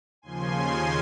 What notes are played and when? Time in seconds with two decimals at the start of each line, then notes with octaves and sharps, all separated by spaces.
0.22 D#2 C#3 F3 G#5 C6